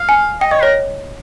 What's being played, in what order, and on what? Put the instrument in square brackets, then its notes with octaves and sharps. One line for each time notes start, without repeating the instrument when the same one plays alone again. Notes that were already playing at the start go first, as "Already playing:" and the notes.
Already playing: [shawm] F5
[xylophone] G#5
[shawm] D#5 [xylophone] G5
[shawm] C#5 [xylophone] D#5
[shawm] A#4 [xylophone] C#5